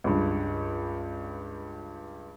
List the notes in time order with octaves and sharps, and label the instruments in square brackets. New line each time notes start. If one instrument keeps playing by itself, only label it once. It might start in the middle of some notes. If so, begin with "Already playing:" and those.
[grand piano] C#2 G2